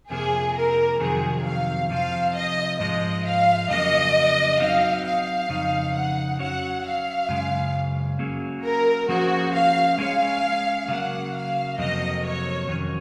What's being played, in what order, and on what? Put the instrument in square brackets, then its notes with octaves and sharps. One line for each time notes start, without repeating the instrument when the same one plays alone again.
[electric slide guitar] F2 C3 F3 A#3 [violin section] G#4
[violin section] A#4
[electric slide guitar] F2 C3 D#3 F#3 [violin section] G#4
[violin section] F5
[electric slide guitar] C3 F3 C4 [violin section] F5
[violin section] D#5
[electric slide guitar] G#2 F3 G#3 [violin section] D#5
[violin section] F5
[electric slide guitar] F2 C#3 F#3 A#3 [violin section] D#5
[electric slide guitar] F#3 C4 D#4 F#4 [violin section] F5
[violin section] F5
[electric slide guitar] F2 C#3 D#4
[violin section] F#5
[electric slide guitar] F#3 C#4 F#4 C#5 [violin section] F#5
[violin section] F5
[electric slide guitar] F#2 C#3 G#3
F#3 A#3 C#4 G#4
[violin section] A#4
[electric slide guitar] F3 A#3 C#4 G#4 C5 [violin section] F#4
[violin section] F5
[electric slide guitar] G#3 C#4 G#4 C#5 [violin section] F5
[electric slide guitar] C#3 F#3 A#3 [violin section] F#5
[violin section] F5
[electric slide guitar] F2 C3 F#3 A#3 [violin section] D#5
[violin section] C#5
[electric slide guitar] F2 D#3 F#3 C#4